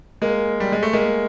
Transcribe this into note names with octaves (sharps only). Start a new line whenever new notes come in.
G#3 A#3
G3
G#3
A3
G#3 A#3